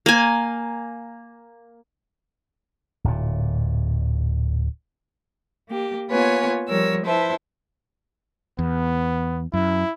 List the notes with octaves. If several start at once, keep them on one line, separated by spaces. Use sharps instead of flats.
A#3 G#5
D1 A#2
A#3 G4
A#3 B3 F4 B4 C#5 G#5
F3 G3 A#4 C#5 E6
E4 B4 C5 E5 A5
E2 B3
F#2 E4